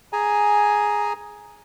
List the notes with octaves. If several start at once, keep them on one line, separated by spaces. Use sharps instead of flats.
G#4 G#5 A#5